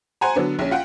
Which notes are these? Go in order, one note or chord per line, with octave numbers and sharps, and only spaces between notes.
C5 F#5 G#5 A#5
D3 F#3 B3 D4
A#1 C#4
F4 F#5 G5